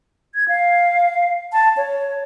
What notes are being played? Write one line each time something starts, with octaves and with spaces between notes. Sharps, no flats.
G#6
F5
A5
C#5